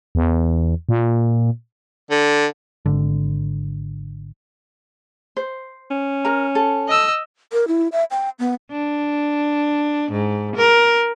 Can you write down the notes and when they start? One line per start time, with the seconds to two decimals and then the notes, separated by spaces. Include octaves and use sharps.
0.15 E2
0.89 A#2
2.10 D3
2.86 G#1 D3
5.37 C5
5.91 C#4
6.25 A#4 A#5
6.55 A4
6.88 D#5 E6
7.53 A#4
7.68 E4
7.92 E5
8.11 G5
8.39 B3
8.71 D4
10.12 G#2
10.57 A#4